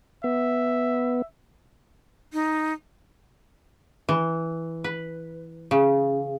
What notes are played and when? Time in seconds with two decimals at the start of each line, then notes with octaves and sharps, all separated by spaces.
0.24 B3 E5
2.33 D#4
4.09 E3
4.84 B4
5.71 C#3